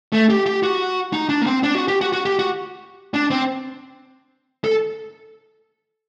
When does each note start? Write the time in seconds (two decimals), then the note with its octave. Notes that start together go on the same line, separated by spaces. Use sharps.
0.13 A3
0.30 G4
0.46 G4
0.63 F#4
1.13 D#4
1.29 D4
1.41 A#3
1.46 C4
1.63 D4
1.75 F#4
1.88 G4
2.01 F#4
2.13 F#4
2.25 G4
2.39 F#4
3.14 D4
3.30 C4
4.64 A4